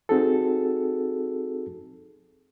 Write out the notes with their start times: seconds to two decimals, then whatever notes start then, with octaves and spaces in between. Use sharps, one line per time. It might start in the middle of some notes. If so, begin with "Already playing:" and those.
0.09 C4 D#4 F#4 G#4 A4